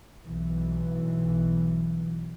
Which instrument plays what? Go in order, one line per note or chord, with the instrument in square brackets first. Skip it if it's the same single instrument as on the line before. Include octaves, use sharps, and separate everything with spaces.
[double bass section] B1 E3